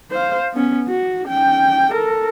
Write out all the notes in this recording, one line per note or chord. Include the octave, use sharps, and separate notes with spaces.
C5 F5
B3 C#4
F#4
C#4 G5
A4 A#4